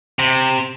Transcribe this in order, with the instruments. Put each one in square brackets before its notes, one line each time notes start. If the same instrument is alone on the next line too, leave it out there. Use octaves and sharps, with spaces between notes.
[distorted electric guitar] C3